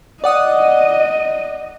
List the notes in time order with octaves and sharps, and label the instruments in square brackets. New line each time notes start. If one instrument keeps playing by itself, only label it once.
[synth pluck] D5 F#5 D#6 [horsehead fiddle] D#5